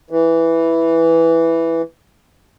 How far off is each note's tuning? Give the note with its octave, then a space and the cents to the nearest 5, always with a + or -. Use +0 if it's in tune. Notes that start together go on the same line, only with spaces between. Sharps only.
E3 +0